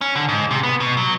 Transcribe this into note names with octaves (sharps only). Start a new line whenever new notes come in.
C#4
D3
G#2
C3
B3
B2
F#3